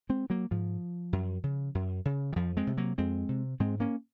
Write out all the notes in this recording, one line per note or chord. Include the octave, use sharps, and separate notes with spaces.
G#3 C4
F#3 A#3
G#2 F3
F#2
C#3
F#2
C#3
D#3
F2 F3
G#3 C4
C3
F#3 A#3
F2 G#3 C4
C3
G#2 G#3 C4
A#3 C#4